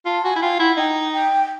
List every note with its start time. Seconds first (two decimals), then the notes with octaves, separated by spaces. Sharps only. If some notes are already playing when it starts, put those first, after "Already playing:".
0.06 F4 A5
0.25 F#4 G#5
0.36 E4
0.42 F4 G5
0.60 E4 F#5
0.77 D#4 G5
1.13 G5